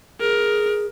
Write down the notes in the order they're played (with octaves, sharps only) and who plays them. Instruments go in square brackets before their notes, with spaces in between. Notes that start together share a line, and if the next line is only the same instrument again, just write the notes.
[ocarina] G#4 [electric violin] A#4